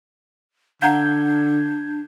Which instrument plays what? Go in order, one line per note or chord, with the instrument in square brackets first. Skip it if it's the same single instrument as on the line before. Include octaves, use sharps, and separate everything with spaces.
[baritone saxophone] D3 [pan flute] D4 [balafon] F5 F#5 A#5 [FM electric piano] G6 G#6